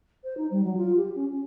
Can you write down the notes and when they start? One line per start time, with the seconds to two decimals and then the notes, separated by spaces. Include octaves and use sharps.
0.24 C5
0.37 D#4
0.51 G3
0.64 F#3
0.77 F4
0.97 G4
1.15 C#4
1.32 C#4